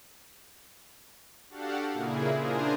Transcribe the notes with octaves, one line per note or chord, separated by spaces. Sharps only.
D4 F#4 G4 A4 F5 F#5
A#2 C#3 A#3 E4 G#4
D4 F4 G#4 A#4 C5